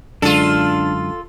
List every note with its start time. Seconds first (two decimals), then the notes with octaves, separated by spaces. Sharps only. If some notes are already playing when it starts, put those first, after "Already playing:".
0.22 F#2 D3 G#3 D4 F4 A4